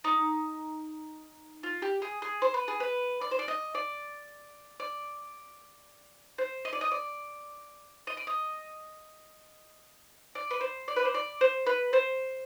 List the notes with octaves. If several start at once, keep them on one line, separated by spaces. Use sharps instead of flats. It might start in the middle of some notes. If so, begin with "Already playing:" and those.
D#4
F4
G4
G#4
G#4
C5
B4
G#4
B4
D5
C5
D5
D#5
D5
D5
C5
D#5
D5
D#5
D5
D#5
D5
D#5
D5
B4
C5
D5
B4
C5
D5
C5
B4
C5